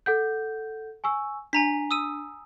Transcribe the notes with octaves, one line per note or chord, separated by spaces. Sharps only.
A4 F#5 G6
G#5 C#6 E6
D4 G#5 A#5 B6
D#6 E6 D#7